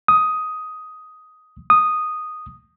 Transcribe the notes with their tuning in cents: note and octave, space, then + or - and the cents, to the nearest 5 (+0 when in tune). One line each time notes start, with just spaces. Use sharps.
D#6 +10
D#6 -5